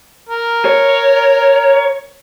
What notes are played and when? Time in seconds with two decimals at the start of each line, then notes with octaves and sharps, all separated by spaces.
0.29 A#4
0.65 C#5